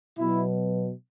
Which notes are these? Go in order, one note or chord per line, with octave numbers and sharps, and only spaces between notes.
B2 F#3 B3 E4